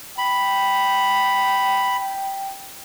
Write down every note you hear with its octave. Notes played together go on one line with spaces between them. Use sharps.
G5 B5